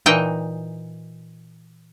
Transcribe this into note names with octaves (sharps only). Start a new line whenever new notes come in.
A#2 E3 D#4 D#5 G5